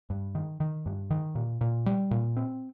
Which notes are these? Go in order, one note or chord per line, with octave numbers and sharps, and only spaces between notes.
G2
D#3
D#3
G2
D#3
A#2
A#2
G3
A#2
C4